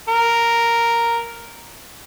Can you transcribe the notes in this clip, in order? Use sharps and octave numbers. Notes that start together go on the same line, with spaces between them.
A#4